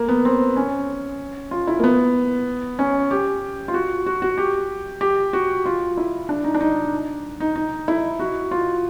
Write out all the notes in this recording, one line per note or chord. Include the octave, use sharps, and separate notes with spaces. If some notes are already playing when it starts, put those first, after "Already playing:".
Already playing: A#3
B3
C4
C#4
F4
E4
A#3
B3
C#4
G4
F4
F#4
F#4
F#4
G4
G4
F#4
F4
E4
D4
D#4
D4
D#4
D#4
D#4
E4
F#4
F4